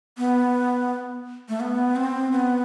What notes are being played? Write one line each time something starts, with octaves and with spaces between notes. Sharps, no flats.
B3
A3
B3
C4
B3